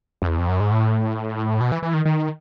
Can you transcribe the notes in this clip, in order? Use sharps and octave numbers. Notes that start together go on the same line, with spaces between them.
F2
E2
F2
F#2
G#2
A2
B2
E3
E3
D#3
D#3